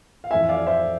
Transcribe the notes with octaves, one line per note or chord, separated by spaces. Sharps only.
F5
F2 E3 A3 C4 E5 G#5
D5 F5
C5 E5